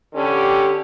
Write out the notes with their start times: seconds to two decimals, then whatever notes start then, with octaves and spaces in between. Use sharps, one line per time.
0.15 D3 C#4 G4